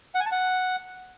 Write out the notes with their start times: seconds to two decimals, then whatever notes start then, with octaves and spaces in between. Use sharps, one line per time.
0.15 F#5
0.20 G#5
0.26 A5
0.32 F#5